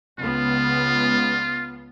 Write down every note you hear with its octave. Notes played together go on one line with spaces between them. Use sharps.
C#2 B3 F4